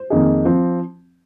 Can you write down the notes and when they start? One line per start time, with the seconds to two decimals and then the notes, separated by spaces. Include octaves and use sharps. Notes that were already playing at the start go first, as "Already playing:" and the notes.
Already playing: C5
0.10 F2 D#3 A#3 D#4 G#4
0.45 F3 C4